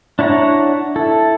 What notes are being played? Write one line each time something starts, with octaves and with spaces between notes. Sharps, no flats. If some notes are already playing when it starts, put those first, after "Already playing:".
D4 E4 C#5 F#5 A#5
E4 A4